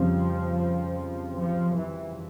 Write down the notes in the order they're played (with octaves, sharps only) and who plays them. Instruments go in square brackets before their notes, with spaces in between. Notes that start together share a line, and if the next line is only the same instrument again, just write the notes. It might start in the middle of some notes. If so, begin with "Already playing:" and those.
Already playing: [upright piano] F2 C#3 G3 C4 F4 [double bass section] F3
[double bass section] F3
E3